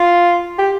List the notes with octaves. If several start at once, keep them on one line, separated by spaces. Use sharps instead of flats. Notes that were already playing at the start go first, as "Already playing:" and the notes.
Already playing: F4
G4